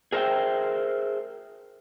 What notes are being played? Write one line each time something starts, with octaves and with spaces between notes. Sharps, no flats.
G#4 A#4 C5 C#5 E5 G5